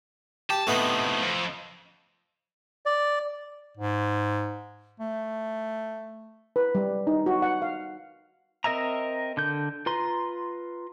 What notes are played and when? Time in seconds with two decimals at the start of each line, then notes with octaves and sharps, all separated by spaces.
0.50 G4 A5
0.67 A2 C3 A3 B3 D#4
1.21 F2
2.86 D5
3.77 G#2
5.00 A3
6.56 B4
6.75 G3
7.07 D#4
7.26 F#4
7.42 F#5
7.62 F5
8.64 C4 A#4 D#5 E5 A#5
9.37 D3 G6
9.86 F4 B4 A#5 C6